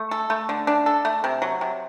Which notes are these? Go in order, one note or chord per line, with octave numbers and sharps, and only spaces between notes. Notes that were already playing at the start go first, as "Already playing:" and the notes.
Already playing: A3
A4
A3
D3
D4
A4
A3
C3
F#3
C3